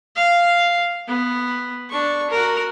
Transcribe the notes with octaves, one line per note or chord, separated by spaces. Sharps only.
F5
B3
D4 C#6
F#4 A#4